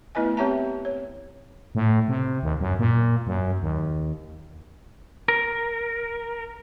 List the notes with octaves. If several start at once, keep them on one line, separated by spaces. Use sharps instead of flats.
A3 B3 E4 B4 D#5 G#5
C4 G4 C#5 E5 A5 A#5
C#5
A2
C3
D#2
F#2
A#2
F#2
D#2
A#4